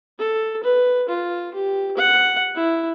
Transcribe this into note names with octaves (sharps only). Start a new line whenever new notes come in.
A4
B4
F4
G4
F#5
E4